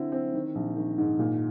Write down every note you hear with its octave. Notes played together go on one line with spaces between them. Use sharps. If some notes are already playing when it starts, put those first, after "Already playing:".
Already playing: D3 C4 E4
C4
D#3
A#1
D#3
G#2
A#2